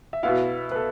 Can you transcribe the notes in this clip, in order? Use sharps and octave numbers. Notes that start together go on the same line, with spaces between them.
E5
B2 B3 E4 F5
B4
A4